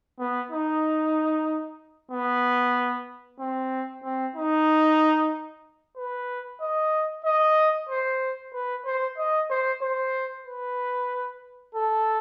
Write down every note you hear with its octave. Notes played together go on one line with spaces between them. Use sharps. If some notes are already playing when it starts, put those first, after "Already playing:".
B3
D#4
B3
C4
C4
D#4
B4
D#5
D#5
C5
B4
C5
D#5
C5
C5
B4
A4